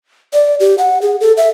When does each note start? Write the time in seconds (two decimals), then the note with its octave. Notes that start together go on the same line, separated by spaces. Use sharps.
0.33 D5
0.60 G4
0.78 F#5
1.02 G#4
1.21 A4
1.37 E5